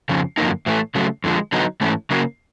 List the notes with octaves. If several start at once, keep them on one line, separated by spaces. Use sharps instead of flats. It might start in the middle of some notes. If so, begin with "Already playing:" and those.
F2 C#3 F3
F#2 D3 F3 A#3 D#4
A2 E3 A3
C#3 F#3 A3
F2 D3 F3 G#3
D3 F#3 B3 D#4
G#2 E3 A3 C#4
C#3 F#3 A#3